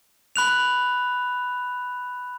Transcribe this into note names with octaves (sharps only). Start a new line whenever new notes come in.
B5 F#6 F7